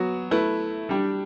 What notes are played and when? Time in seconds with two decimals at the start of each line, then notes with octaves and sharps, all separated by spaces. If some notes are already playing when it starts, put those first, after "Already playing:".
Already playing: F#3 B3 F#4
0.31 A3 E4 B4
0.89 G3 D4 G4